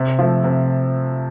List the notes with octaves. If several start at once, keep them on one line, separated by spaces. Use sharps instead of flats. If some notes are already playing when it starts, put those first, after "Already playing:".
Already playing: C3
F3 A3
C3